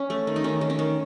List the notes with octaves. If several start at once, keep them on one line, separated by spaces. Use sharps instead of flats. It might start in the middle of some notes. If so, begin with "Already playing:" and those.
Already playing: C#4
A3
D#3
D#4
D#3 C#4
D#3
C#4
D#3